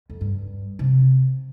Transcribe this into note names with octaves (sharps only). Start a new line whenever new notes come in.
F2
G2
C3